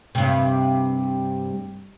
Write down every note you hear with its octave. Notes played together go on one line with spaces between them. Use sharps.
G2 C3